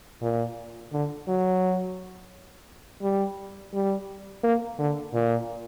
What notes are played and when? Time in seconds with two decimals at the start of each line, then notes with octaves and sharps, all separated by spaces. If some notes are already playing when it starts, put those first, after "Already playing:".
0.22 A#2
0.93 D3
1.28 F#3
3.03 G3
3.74 G3
4.44 A#3
4.79 D3
5.14 A#2